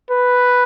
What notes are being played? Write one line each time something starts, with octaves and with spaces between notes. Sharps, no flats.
B4